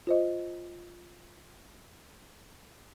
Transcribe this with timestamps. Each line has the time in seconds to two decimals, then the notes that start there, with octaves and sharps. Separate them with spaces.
0.07 F4 C5 D#5